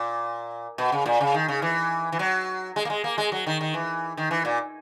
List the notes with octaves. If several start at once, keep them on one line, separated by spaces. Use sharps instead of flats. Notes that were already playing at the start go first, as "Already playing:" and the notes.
Already playing: A#2
B2
C#3
A#2
C#3
D#3
C#3
E3
E3
F#3
G#3
A#3
G#3
A#3
G#3
F#3
D#3
D#3
E3
D#3
E3
A#2